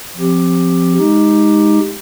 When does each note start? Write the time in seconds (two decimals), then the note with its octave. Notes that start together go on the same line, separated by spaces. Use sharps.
0.16 F3 C4 G4
0.97 G#3 D#4 G4